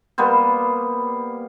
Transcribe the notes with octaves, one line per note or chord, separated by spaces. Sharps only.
G3 A#3 B3 C5